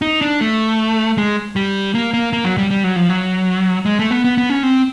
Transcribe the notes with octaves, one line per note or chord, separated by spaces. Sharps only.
D#4
D4
A3
G#3
G3
A#3
A#3
A#3
F#3
G3
G3
F#3
F3
F#3
G#3
A3
B3
B3
B3
C#4
C4